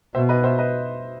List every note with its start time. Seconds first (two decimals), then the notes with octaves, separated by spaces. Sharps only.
0.15 B2 C5 E5
0.29 B4 D#5
0.44 C5 E5
0.59 B4 D#5